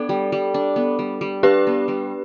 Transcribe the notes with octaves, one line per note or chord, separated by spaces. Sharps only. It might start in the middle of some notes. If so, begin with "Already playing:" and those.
Already playing: B3 D4 A4
G3
G3
D4
B3
G3
G3
D4 G4 B4
B3
G3